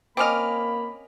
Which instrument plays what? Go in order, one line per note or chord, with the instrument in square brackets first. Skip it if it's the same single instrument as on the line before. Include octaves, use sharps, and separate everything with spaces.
[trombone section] A#3 [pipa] C4 C#4 D#5 [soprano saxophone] B5 [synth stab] D6 F6